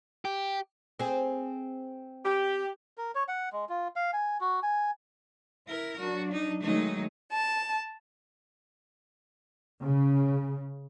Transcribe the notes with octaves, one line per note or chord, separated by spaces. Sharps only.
G4
C4 G#4
G4
A#4
C#5
F#5
G#3
F4
F5
G#5
F#4
G#5
E4 A#4
F#3 D4 F#4
D#4
D#3 F#3 G#3 A3 D#4
A5
C#3